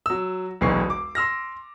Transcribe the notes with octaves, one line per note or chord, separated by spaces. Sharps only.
F#3 E6
E1 B1 E2 E3 C#6 C7
D6
C6 E6 F6 A#6